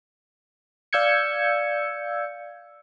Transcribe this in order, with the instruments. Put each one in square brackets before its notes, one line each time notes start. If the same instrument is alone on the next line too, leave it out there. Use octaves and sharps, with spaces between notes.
[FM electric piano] D5 F5 E6 G6 G#6 C#7